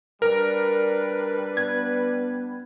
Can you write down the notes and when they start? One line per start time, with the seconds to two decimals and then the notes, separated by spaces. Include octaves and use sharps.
0.22 G3 D4 A#4 B4
1.57 B3 G#6